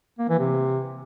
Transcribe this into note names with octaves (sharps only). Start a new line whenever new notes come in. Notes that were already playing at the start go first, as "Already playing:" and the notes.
A#3
E3
C3